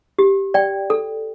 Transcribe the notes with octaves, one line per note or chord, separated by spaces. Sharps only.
G4
D5 G5
A4